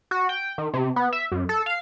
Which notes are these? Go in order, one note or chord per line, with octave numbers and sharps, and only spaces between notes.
F#4
G5
D#3
C3
B3
E5
F#2
A4
F5